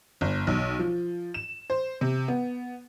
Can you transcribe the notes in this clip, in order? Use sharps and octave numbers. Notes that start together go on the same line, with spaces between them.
G1
B1
F3
E7
C5
C3
B3